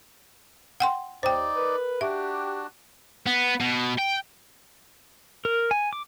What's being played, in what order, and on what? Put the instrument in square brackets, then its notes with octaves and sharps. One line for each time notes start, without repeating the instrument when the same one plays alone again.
[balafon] F#5 G5 C6
[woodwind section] D#2 [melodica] D#4 D5 [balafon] C5 G5
[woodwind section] A#4 B4
[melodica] D4 F#4 [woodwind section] G4 [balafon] E5
[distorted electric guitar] B3
B2
G5
[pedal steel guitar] A#4
G#5
D6